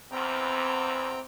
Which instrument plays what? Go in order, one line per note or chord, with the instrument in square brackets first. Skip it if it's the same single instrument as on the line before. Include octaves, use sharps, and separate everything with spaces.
[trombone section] E2 [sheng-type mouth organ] C4 G5 A#5